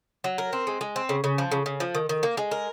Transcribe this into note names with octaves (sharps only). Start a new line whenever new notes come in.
F#3
A#4
C4
G#3
G#3
C4
C#3
C#3
F3
C#3
C#3
F3
D#3
D#3
A#3
G#3
A#4